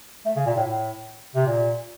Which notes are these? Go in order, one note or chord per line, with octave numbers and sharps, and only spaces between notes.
A3
C#3
A#2
A2
A2
C3
A#2